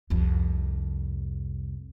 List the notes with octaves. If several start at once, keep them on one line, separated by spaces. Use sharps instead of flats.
C2 F2